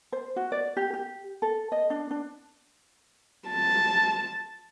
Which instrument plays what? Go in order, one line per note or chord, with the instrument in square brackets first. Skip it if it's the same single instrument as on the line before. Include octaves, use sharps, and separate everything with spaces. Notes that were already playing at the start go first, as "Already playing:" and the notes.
[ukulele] C5
F#4
D5
G4
G4
A4
D#5
D4
D4
[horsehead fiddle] A5